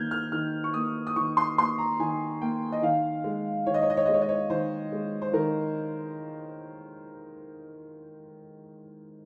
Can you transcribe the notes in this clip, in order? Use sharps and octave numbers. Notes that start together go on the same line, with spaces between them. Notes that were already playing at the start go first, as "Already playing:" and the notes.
Already playing: D#3 A#3 F6 G6 G#6
F6
D#3 F6
C#6
A#3 D#6
D#6
D#3 C#6
C6
A#3 C6
A#5
D#3 G#5
A#3 G5
D#5
D#3 F5
G#3
D#3 C#5
D#5
C#5
D#5
C#5
G#3 D#5
C#5
D#5
C#5
D#3 C5
G#3
C5
D#3 A#4